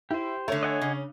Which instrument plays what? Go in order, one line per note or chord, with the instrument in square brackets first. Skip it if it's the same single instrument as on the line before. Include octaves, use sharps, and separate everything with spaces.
[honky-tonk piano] E4 [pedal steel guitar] G4 C5
[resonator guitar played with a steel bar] D3 A3 [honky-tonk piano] C#5
[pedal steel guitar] D#5 F#5 G#5
[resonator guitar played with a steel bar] C#3